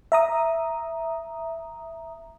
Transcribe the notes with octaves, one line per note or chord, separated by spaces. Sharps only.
E5 A#5 D#6